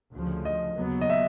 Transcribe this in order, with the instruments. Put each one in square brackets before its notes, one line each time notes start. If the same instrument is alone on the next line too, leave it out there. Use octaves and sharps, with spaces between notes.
[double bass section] D2 C#3 F3
[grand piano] D#5
[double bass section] D#2 C#3 F#3 B3
[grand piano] D#5
E5